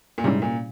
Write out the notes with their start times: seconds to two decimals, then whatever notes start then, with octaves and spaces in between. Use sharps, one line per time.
0.18 A#2
0.24 G#2 C3 G3 C#4 E4
0.42 A#2